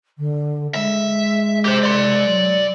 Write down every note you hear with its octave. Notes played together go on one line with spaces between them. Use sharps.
D3
G#3 E5
G4 C5
D5 C6
F#3